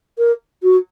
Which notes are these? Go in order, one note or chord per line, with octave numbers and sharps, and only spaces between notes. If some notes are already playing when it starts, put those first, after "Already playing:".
A#4
F#4